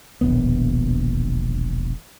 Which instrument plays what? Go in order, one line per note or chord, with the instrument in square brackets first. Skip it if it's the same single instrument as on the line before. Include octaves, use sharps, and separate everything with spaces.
[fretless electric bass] E1 A#1 D#2 B3